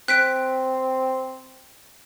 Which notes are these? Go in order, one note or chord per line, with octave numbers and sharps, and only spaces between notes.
C4 F#6 B6 D7